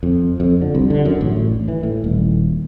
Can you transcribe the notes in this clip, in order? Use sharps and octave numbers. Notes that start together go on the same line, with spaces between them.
F2
F2
D3
C2
D3
F#2
A1
E3
A2
D#1